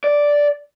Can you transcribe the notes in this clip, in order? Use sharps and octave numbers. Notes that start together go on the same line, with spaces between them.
D5